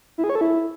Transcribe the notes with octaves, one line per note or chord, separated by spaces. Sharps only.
E4
G#4
C#5
A4
E4